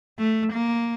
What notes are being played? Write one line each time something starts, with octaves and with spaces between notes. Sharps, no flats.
A3
A#3